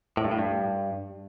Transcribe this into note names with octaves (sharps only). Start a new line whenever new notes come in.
A2
G2
A2
G2